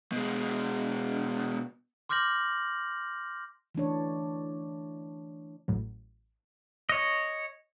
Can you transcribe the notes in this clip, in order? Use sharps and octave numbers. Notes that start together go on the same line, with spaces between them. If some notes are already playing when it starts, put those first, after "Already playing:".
B2 G#3
C6 D6 F6 G6 A#6 F#7
E3 A3 D4 C#5
A1 A2 F#3
C#5 D#5